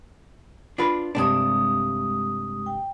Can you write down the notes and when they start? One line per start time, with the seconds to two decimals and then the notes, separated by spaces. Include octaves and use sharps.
0.78 D4 F4 B4
1.15 G2 C3 G#3 D4 D#6
2.66 G5